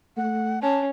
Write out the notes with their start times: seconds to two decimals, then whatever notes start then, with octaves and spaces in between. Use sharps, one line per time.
0.17 A3 F#5
0.62 C#4 A5